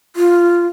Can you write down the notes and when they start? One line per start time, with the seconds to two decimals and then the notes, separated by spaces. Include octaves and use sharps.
0.16 F4